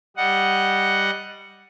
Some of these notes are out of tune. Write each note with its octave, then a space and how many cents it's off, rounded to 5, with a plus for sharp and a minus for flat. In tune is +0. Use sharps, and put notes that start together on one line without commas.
G3 +0 D#5 +0 F#5 +0